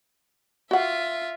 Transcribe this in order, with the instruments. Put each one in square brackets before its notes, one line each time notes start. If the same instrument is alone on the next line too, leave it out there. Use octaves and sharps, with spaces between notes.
[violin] F4 E5 [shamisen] F#4 F#5